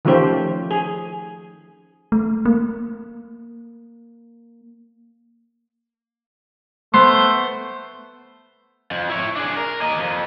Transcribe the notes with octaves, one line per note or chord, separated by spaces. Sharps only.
D#3 F3 A3 C#4 G4 C5
G#4
A3
A#3
A3 B3 C5 C6
F2
E4 C#5
D4 G#4
A#4
A#3 D#5
F2